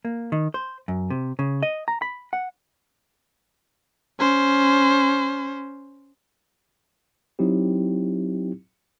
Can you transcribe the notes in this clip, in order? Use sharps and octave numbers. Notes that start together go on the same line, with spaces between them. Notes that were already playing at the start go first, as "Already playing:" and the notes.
A#3
D#3
C5
F#2
C3
C#3
D#5
A#5
B5
F#5
C#4 C5
F#3 C4 D#4 E4 G4